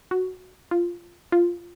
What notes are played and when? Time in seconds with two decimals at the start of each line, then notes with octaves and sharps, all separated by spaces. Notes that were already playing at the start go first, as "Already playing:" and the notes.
0.11 F#4
0.71 F4
1.32 F4